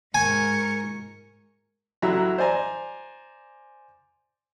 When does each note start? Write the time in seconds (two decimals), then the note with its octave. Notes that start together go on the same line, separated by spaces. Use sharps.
0.15 G#2 A#4 G#5 C#6
2.02 A1 F#3 E4 F#4 E5 A#5
2.38 C5 D5 G#5 A#5